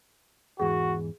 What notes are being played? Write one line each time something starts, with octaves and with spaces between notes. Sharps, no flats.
E2 G#2 E3 F#4 G#4